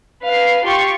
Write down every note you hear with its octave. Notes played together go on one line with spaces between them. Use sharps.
B4 F5 C7
F4 G4 C6 C#6